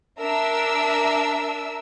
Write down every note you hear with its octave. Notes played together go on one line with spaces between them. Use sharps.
D4 A#4 E5 E6